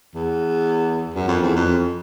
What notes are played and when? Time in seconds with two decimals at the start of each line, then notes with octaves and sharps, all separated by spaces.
0.15 E2
1.14 F#2
1.28 F2
1.42 E2
1.57 F2